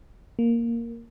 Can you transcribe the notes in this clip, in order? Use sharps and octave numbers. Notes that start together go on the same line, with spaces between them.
A#3